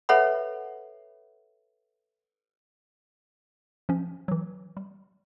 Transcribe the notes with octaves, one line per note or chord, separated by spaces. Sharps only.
A4 B4 C#5 E5 F#5 B5
F3 C#4
E3 F#3
G3